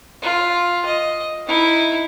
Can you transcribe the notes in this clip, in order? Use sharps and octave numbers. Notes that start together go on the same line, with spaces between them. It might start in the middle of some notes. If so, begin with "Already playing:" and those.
F4
D#5
D#4 E4